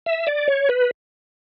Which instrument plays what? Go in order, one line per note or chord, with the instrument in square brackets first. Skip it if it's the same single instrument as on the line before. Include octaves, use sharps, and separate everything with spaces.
[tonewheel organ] E5
D5
C#5
B4